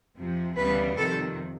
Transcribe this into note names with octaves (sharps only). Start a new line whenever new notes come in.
F2 C3 F3
D2 C#3 E3 G3 B3 B4
F2 C3 D#3 A4